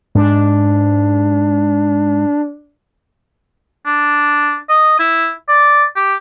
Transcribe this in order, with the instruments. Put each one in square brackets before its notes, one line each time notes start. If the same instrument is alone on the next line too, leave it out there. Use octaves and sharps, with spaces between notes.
[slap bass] G#2 G#3 [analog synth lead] D4
[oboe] D4
D#5
E4
D5
G4